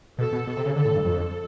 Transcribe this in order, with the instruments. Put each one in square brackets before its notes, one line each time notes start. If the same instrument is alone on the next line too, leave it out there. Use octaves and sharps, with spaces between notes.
[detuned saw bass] B2 [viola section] A4
[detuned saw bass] B2
[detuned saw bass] B2 [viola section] A4
[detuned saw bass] C3
C#3
[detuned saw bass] D3 [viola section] A4
[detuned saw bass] A2
G2
[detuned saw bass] F2 [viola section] A4